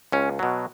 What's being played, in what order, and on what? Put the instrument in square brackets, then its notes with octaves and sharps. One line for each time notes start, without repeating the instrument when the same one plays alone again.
[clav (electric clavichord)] C#2 C#4
B2 F#3